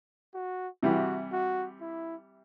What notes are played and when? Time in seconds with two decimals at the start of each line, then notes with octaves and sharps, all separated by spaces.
0.34 F#4
0.83 C3 E3 G3 F#4
1.32 F#4
1.81 E4